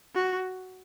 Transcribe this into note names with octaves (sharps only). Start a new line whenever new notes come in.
F#4